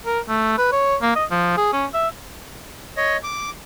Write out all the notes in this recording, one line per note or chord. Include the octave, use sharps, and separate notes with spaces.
A#4
A3
B4
C#5
A#3
D#5
F3
G#4
C#4
E5
C#5 D#5
D6